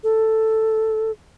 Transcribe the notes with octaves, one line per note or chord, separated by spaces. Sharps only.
A4